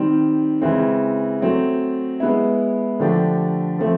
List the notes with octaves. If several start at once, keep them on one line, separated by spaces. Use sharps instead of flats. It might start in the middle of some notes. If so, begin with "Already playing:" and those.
Already playing: D#3 G3 C4
C#3 E3 G#3 C4
F#3 A3 C4
G#3 B3 E4
D3 F3 A3 D4 G4
F3 A3 C4